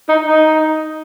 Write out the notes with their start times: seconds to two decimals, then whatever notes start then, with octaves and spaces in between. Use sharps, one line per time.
0.09 D#4
0.22 D#4